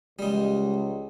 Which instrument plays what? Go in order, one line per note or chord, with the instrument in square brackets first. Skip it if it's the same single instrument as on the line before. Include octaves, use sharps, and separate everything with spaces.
[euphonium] C#2 [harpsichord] G3 G#3